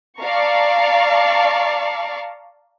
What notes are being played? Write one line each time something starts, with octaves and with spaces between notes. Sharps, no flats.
D5 F5 A5 A#5 C#6